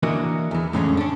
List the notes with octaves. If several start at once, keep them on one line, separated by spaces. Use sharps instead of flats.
E3 A#3 D4 F#4 A#4 D#5
E2 E3
F2 A2 D3 G#3 A3 C#4
C#4 D4